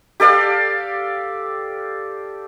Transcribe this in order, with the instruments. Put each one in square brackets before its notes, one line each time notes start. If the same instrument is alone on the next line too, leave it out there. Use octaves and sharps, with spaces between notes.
[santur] G4 A4 D5 F5